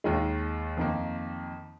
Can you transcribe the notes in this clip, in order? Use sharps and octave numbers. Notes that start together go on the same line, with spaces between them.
D#2 D#3 G#3
F2 D#3 A#3